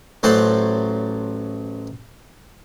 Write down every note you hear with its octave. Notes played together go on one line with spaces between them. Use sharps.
A1 F#3 A3 C5 F#5 A5